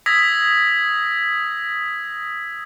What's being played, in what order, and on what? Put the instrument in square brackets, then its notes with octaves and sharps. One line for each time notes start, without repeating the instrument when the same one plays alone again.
[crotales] D#6 E6 G#6 A#6 B6